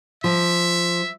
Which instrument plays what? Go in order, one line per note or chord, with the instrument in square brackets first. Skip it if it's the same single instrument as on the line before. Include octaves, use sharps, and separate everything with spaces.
[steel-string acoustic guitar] F3 [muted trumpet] E5